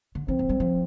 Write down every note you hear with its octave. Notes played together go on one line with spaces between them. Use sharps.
D3
E3 C4
F3
G3
F3